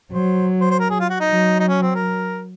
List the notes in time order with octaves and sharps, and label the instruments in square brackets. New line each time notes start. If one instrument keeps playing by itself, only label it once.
[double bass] F#3 [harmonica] C5
[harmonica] C5
C5
A#4
G#4
F4
F#4
D#4
[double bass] F#3
[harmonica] D#4
C#4
C4
A#4